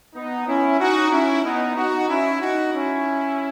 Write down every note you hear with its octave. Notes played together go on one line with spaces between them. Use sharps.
B3 D#4
C#4 E4
D#4 F#4
C#4 E4
B3 D#4
D#4 F#4
C#4 E4
D#4 F#4
C#4 E4